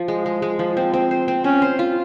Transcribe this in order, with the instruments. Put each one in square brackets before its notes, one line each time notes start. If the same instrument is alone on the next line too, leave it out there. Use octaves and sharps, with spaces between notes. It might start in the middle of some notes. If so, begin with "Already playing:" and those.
Already playing: [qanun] F3
G#3
G#3
G#3
F3
C4
C4
C5
C4
[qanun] C4 [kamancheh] C#4
[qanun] C5
F4